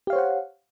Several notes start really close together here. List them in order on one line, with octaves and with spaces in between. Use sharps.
G4 F5 C#5 C5 F#5